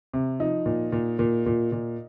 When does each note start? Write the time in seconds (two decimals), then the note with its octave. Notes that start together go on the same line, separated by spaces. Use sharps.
0.14 C3
0.40 F3 D#4
0.66 A#2
0.92 A#2
1.19 A#2
1.46 A#2
1.72 A#2